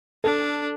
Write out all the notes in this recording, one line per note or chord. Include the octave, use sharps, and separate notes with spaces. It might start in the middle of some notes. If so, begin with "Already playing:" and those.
D4 A4